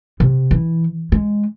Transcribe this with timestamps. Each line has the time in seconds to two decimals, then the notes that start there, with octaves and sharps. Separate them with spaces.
0.20 C3
0.51 E3
1.12 G#3